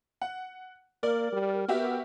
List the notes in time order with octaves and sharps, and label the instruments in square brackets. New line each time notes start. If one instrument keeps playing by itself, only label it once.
[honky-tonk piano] F#5
[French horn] A#3 [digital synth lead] A#4 [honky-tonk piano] D5
[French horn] G3
[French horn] B3 [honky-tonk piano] F#4 G4 E5